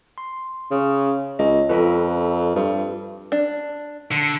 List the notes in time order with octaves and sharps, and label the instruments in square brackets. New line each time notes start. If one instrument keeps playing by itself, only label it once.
[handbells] C6
[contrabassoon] C#3
[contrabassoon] C#2 [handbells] D#5
[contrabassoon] F2 [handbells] F4 A4 B4
[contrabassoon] G2
[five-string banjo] D4
[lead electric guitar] D3